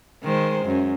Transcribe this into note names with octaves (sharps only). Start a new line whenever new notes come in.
D#3 G#3 C5
F#2